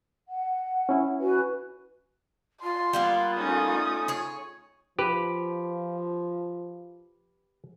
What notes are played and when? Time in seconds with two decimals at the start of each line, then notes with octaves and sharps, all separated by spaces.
0.28 F#5
0.89 C#4 E4
1.20 F#4 B4 G#5
2.63 F4 C6
2.93 G3 A#3 B3
3.35 A3 C#4 D#4 D#6
4.08 G#4 C#5
4.99 F3 G4 B4